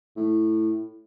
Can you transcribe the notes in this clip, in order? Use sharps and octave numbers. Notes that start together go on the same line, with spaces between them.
A2